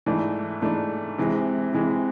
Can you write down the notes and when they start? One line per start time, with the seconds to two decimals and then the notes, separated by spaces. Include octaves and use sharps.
0.06 G#2 E3 A3 D4
0.61 G#2 E3 A3 D4
1.18 C3 E3 G#3
1.73 C3 E3 G#3